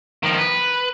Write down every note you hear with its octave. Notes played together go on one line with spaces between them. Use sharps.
D#3 F3
B4